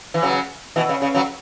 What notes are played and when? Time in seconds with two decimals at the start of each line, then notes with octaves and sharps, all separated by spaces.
0.14 E3
0.22 C#3 F#3
0.76 B2 E3
0.89 C#3
1.02 C#3
1.15 C#3 F#3